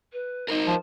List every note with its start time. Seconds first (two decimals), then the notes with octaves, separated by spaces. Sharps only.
0.13 B4
0.48 D#4 A#4 C5 D#5
0.67 F3